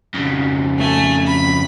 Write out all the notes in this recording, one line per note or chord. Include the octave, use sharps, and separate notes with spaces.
F2 C#3
A3 G#5
B5